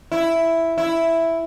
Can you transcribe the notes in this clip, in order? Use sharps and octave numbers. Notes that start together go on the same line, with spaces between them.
E4
E4